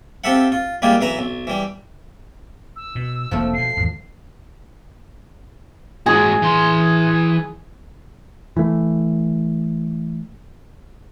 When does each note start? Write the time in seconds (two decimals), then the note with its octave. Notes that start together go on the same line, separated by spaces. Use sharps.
0.24 C4 F4 G4 A4 E5 F#5
0.52 F4
0.82 G3 G#3 A#3 E4 F4 G4
1.01 B1 E3 B4 E5 A#5
1.19 B1
1.47 E3 G3
2.76 E6
2.95 B2
3.31 F1 F3 A3 A#3
3.53 B2 D3 C7
3.77 G#1 E2
6.06 G#2 F#4 G#4
6.42 E3 C6
8.57 E3 A3